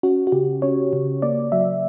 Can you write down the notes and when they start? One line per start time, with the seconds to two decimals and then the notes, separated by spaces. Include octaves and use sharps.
0.03 C#4 F#4
0.27 F#4
0.32 C#3 G4
0.62 C#4 C#5
0.93 C#3
1.22 A#3 D5
1.52 F#3 E5